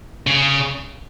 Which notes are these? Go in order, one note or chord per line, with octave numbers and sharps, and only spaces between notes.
C#3